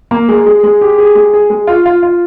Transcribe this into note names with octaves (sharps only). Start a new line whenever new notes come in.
A#3
G#3
G#3
G#3
G4
G#4
G#3
G#4
G#3
F4
F4
F4